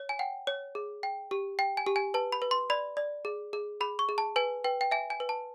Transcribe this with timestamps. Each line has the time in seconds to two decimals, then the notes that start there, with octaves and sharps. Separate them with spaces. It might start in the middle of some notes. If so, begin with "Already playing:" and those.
Already playing: C#5
0.09 G#5
0.19 F#5 G5
0.47 C#5
0.75 G#4
1.03 G5
1.31 G4
1.59 G5
1.77 G#5
1.86 G4
1.96 G#5
2.14 B4 A5
2.32 B5
2.42 B4
2.51 C6
2.70 D5 B5
2.97 D5
3.25 G#4
3.53 G#4
3.81 G#4 B5
3.99 C#6
4.09 G#4
4.18 A5
4.36 B4 G#5
4.64 B4 G5
4.81 G5
4.91 E5 G#5
5.10 G#5
5.20 B4
5.29 A5